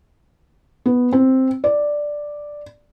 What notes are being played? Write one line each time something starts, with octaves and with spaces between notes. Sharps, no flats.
B3
C4
D5